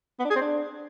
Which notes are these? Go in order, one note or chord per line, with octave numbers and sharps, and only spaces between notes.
B3
D4
G#4
C4
D4